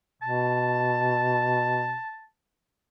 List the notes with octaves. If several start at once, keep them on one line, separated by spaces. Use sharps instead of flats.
B2 A5